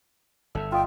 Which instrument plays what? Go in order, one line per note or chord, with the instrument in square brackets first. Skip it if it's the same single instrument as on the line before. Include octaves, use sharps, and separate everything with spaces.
[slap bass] G1 G2 [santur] A4 E5
[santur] F4 D#5 [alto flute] G5